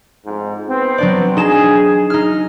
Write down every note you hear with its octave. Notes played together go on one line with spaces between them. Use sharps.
F2 G#2
B3 C4
F#3 D4 D5
D#4 G#4 E7
D#4 F6